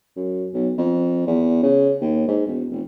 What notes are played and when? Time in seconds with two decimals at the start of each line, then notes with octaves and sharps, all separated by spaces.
0.16 F#2
0.54 B1
0.78 F2
1.27 E2
1.63 C#3
2.01 D#2
2.27 G#2
2.46 E1
2.71 F1